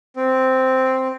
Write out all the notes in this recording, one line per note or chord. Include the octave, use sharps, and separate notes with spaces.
C4